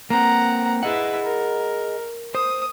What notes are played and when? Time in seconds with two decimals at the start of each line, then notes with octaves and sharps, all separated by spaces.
0.10 A#3 C4 F#5 A#5
0.83 E4 G#4 B4 D#5 F#5
1.24 A#4
2.35 C5 D#6